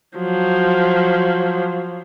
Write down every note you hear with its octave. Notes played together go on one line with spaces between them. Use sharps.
F3 F#3